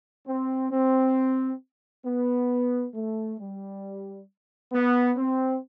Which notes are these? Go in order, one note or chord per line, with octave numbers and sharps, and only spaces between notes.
C4
C4
B3
A3
G3
B3
C4